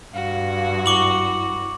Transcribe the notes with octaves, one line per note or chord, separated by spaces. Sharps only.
G2 F#4 F5
E4 C#6 D6 F#7